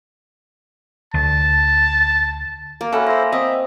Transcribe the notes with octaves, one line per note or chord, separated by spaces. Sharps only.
D2 A5
A#3
C#4 F#4 A4 E5 G#5 B5
E4 C5 A#5 A#6
C4 D#5 E5